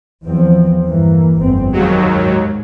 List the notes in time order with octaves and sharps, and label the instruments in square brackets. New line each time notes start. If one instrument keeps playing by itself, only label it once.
[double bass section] E2 F3 C4
G2 E3 A#3
G1 F2 C4
[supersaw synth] D#2 F#3 [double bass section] G#3
[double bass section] G#2